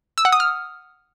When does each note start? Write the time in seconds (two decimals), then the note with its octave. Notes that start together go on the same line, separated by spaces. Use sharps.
0.18 E6
0.25 F#5
0.32 D#6
0.40 F6